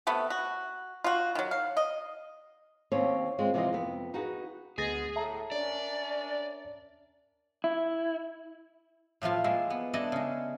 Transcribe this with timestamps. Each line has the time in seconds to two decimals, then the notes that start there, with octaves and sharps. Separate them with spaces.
0.07 C3 A3 B3
0.30 F#4
1.04 F4 F#4
1.35 D#3 F#3
1.51 F5
1.77 D#5
2.92 D#2 C4 C#4 C#5
3.39 G#3 C4 F4
3.54 C3 E3 F3 G#3 C4 D#5
3.73 F2 B3
4.14 D#4 F#4 G#4 B4
4.78 D2 G#3 B3 G#4 A6 A#6
5.16 A2 A3 E5 A5 A#5
5.52 C#4 D4 A#4 D5
7.64 E4
9.22 A2 F3 A3 F4
9.44 G#3 A#3 E5
9.70 B3
9.94 D4 E4 A4 D#5
10.12 C#3 G#3